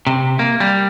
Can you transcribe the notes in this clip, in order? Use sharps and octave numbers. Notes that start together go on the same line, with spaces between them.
C3
A#3
G3